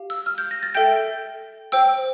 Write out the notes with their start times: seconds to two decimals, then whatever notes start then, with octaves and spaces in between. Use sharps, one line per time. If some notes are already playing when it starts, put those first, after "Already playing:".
Already playing: G4 F5
0.10 E6
0.26 F6
0.38 G6
0.51 A#6
0.63 A6
0.75 A4 E5 G5 G6
1.72 C5 G5 E6